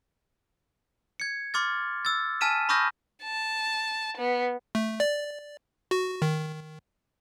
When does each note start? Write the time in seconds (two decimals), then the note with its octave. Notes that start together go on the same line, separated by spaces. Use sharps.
1.20 G#6 C#7
1.54 C6 D6 F6 A6
2.05 E6 A6
2.41 G#5 A5 F6 B6 D#7 E7
2.69 B5 C#6 D#6 F6 G6 A#6
3.24 A5
4.17 B3
4.75 A3
5.00 D5
5.91 F#4
6.22 D#3